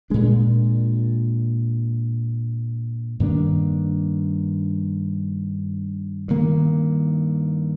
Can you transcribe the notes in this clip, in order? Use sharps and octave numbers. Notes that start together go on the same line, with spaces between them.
A#2 G#3 D4
G2 D#3 A#3 D4
G2 D#3 A#3